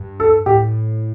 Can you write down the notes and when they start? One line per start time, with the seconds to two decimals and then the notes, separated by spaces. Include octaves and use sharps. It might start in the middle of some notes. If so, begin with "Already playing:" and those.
Already playing: G2
0.20 A4
0.46 A2 G4